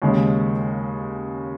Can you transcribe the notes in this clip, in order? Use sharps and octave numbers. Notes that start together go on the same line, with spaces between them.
D#2 C#3 G#3